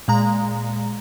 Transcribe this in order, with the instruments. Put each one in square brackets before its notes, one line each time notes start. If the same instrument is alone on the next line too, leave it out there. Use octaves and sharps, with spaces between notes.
[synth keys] A#2 G#3 A#5